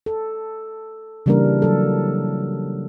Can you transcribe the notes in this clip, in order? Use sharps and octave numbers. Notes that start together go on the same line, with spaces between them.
A4
C#3 E3 G3 A#3 D4 A#4
F#3 A4